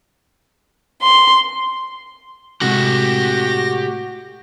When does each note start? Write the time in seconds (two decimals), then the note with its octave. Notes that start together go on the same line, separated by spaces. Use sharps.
1.03 C6
2.61 A2 C3 G#3 F#4 G4 F#5 A#6